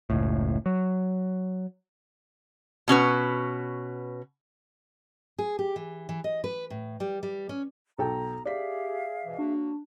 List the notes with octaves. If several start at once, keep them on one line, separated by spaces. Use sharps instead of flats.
F#1 C#2 A2
F#3
B2 C#4 F#4 B4
G#4
G4
E3
E3
D#5
B4
A2
G3
G3
C#4
B1 A4 G5 A#5
G4 G#4 D5 E5 F5 B6
G#2 B2 E3
F#3 A#3 D4 F#4